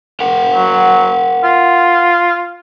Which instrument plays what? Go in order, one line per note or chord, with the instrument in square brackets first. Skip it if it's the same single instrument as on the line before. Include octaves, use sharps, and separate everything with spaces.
[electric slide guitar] A#4 F#5 G5
[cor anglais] F#3
F4